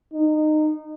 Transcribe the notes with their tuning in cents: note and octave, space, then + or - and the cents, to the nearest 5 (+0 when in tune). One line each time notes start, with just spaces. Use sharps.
D#4 -20